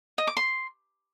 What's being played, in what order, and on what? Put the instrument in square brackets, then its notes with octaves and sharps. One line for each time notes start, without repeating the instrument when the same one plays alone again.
[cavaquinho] D#5
D6
C6